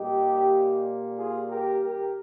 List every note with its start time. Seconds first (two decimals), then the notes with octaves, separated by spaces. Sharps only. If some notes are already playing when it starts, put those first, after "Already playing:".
Already playing: A#2 G3 D#4 G4
1.17 F4 G#4
1.49 G4 A#4
1.82 G4 A#4